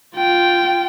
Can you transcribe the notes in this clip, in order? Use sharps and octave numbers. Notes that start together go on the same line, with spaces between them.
F4 G5